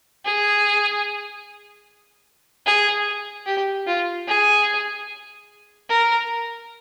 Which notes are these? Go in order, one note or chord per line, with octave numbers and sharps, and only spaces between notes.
G#4
G#4
G4
F4
G#4
A#4